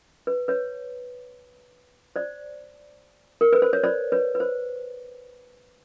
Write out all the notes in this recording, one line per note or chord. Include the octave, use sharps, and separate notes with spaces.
B4
B4 C#5
C5 D5
A#4
B4
C5
C#5
C5 D5
B4 C#5
B4
C5